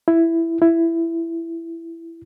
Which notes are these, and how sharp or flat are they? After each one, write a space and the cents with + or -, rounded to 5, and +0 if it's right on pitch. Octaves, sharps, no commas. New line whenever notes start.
E4 +5
E4 +10